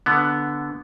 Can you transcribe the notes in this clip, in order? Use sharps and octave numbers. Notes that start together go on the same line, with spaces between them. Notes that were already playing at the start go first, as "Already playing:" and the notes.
D3 B3